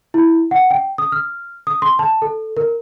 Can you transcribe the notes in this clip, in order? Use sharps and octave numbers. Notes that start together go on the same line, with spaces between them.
E4
F#5
G5
D#6
F6
D#6
C6
A5
A4
A#4